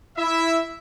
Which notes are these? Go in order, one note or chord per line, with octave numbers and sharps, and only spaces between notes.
E4 E5